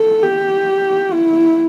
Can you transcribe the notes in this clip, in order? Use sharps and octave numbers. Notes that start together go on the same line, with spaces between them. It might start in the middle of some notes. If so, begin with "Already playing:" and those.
Already playing: A4
G4
E4